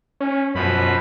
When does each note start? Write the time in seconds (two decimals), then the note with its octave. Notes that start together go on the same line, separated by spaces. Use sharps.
0.20 C#4
0.55 F#2 B2 F3 B5